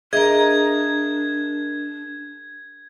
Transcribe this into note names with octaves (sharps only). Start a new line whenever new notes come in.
D4 G#4 A#4 D#5 E5 G#6